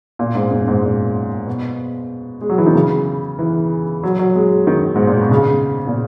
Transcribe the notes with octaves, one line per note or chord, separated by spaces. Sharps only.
A#2
G#2
F#2
G#2
A#2
B2
G#3
F#3
E3
D#3
C#3
E3
F#3
F#3
G#3
D#3
G#2
A#2
B2
C#3
A#2